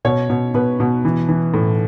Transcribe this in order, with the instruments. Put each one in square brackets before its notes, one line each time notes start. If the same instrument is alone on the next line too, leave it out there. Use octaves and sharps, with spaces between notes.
[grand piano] B2 C#5
B2
B2 B4
B2
E3
E3
A2